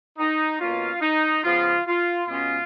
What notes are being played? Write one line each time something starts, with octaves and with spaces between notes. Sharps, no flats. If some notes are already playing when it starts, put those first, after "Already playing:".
D#4
B2 A#3 C#4 F4
D#4
C#3 F3 B3 F4
F4
B2 G#3 C#4 F4